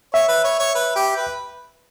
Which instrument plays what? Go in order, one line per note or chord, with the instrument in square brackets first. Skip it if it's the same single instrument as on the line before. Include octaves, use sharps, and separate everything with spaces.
[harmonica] C#5 [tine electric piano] E5
[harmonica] B4
C#5
C#5
B4
G4
B4